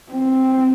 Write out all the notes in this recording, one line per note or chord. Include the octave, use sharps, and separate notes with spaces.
C4